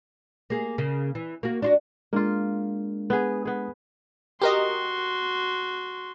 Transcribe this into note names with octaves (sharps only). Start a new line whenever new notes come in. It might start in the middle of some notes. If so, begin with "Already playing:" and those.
A#3 G#4
C#3 A#3
E3
A#3 F#4
D4 F4 F#4
G#3 A#3 D4 F4
B3 G#4
B3 G#4
F#4 G4 A#4 D#5 C6